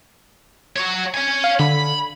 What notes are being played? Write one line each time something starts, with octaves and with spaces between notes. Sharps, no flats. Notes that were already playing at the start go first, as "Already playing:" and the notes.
F#4 C#5
C#5 G#5
F5
D3 B5